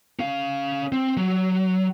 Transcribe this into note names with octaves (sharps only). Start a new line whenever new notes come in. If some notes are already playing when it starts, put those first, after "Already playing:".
C#4 F5
C4
F#3